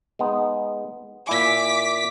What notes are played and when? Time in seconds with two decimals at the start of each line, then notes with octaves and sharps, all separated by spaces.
0.19 G#3 B3 D#4
1.27 A#2 E4 G#5 D6 B6